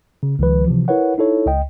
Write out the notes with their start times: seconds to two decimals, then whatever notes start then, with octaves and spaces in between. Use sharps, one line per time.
0.23 C#3
0.39 C#2 D#3 F3 B4
0.66 C3 E3 F3
0.88 E4 A#4 B4 C#5 F#5
1.18 D#4 E4 A4 C#5
1.46 C#2 D#5 G5